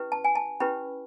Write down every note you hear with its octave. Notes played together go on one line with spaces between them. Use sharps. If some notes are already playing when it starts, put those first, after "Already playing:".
Already playing: C#4 E4 G4 B4
A5
G#5
A5
C#4 E4 G4 B4 B5